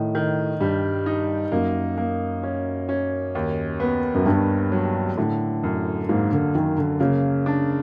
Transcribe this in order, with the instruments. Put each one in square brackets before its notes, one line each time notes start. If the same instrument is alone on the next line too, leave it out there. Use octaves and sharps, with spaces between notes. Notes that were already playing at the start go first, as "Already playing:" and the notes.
Already playing: [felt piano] A2 [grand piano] D#3
[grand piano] D#3
[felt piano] G2 [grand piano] G3
[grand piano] D#4
[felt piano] F#2 [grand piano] A#3
[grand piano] A#3
C#4
C#4
D#2
B3
[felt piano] F#2
[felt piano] G2 [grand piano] B3
[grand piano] F#3
[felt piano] A2 [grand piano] D3
[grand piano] F#2
[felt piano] G#2 [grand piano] A#3
[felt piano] D3
[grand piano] F#2 [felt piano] D#3
[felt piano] D3
[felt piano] C#3 [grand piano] A#3
[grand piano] D4